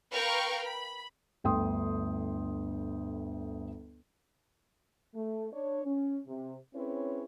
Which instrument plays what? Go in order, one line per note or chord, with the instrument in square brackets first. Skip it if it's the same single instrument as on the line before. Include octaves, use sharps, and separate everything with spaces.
[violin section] A#4 B4 F5 G5 C#6 F6
B5
[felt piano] G1 D2 G5 C6 D#6
[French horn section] A3
D4 C#5
C#4
C3
C4 C#4 E4 G#4 B4 C#5